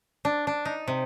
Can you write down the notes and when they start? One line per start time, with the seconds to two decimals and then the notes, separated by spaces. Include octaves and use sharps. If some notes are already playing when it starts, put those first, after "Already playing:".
0.25 D4
0.47 D4
0.65 D#4
0.87 C3